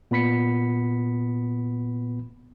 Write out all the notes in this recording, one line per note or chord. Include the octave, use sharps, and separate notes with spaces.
A#2 B3 B5 B6 C#7